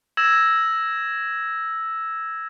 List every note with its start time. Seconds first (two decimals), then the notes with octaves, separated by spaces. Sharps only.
0.17 E6 G#6 A#6 E7